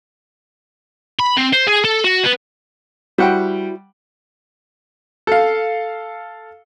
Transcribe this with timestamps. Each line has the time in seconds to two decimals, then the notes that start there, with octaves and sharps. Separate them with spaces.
1.20 B5
1.37 C4
1.53 C5
1.67 G#4
1.84 A4
2.04 F#4
2.23 B3
3.18 G3 E4 F#4 C5 F#5 G5
5.27 A4 F5